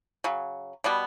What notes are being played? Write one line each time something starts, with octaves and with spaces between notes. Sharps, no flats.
C#3 F#3
B2 G3 B3